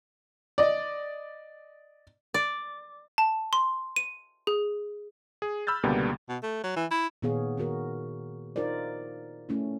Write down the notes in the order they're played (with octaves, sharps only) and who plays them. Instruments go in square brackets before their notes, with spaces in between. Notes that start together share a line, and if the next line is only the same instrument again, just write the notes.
[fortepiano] D5 D#5
[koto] D5
[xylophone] A5
C6
D#7
G#4
[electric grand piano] G#4
B5 E6 F6 G6 A6
C#2 B2 D3 G3 A#3 B3
[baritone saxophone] B2
A3
F#3
E3
E4
[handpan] A#2 D#3 B3 G#4 C#5 F5
D#3 B3 F#4 A#4
D#4 F4 A#4 C5 D5
A3 C#4 E4